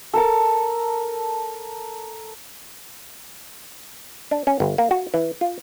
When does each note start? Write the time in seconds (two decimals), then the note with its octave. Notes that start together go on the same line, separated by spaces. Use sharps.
0.14 A4 A#4 A5
4.31 D4
4.47 C#4
4.60 G1
4.78 A#3
4.91 F#4
5.14 E3
5.41 F4